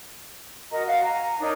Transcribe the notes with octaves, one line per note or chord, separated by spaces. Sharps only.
F#4 A#4 D#5 A#5
F#4 F5
G#5 A#5
D4 D#4 A#4 C#5